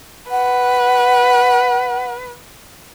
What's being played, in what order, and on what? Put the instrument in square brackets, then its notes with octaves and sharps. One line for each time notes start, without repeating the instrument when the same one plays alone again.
[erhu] B4 [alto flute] F#5